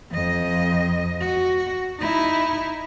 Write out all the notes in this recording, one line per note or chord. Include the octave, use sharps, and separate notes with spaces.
F2 D#5
F#4
D#4 E4